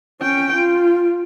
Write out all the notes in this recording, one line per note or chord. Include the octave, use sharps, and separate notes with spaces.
C#4 G5
F4